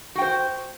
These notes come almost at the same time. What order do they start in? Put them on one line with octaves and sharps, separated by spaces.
F#4 G5 C5